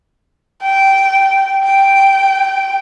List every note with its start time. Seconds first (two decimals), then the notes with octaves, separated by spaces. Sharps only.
0.62 G5
1.64 G5